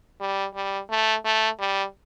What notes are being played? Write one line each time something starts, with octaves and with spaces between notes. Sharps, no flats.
G3
G3
A3
A3
G3